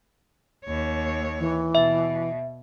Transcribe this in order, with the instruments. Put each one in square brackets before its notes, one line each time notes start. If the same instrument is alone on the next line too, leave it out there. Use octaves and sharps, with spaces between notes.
[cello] D#2 C#5
[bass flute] E3
[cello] B2 [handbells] E5